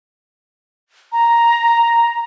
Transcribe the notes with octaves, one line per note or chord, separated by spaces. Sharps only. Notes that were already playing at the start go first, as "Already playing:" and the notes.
A#5